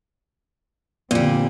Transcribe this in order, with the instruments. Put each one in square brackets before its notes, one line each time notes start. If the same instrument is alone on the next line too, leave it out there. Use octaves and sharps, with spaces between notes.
[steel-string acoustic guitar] A#2 G3 [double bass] D3 C4